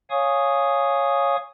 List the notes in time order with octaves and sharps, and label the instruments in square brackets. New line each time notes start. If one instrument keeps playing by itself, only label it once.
[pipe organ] C#5 F5 G#5 C#6 D#6